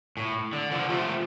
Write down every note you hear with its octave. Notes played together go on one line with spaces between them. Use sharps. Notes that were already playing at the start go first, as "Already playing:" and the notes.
A2
D3
D3 F3
F3 A3
A3